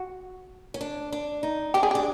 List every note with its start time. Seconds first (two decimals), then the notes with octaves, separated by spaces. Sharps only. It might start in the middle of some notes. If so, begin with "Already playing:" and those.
Already playing: F#4
0.74 C#4
0.81 D4
1.12 D4
1.43 D#4
1.74 D4 G4
1.83 G#4
1.91 D4 G4